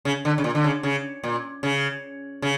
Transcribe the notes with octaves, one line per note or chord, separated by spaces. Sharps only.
C#3
D3
C#3
A#2
D3
C#3
C#3
A#2
C#3
C#3